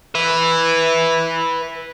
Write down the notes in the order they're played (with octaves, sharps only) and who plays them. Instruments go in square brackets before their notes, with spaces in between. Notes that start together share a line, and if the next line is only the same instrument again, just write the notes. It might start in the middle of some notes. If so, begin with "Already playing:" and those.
[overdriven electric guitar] B4 E5